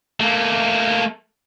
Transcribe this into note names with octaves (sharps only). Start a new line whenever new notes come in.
A3 A#3